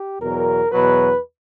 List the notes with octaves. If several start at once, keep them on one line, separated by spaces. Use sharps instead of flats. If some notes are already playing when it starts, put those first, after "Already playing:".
Already playing: G4
E2 B2 F#3 A#4
E2 B2 F#3 B4